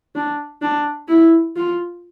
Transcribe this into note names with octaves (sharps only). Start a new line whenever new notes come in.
D4
D4
E4
F4